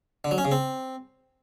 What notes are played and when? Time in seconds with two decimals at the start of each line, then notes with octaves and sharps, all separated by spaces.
0.24 D3
0.31 F#3
0.38 C#4
0.45 C#3
0.51 C4